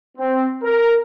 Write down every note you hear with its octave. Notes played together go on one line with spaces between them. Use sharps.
C4
A#4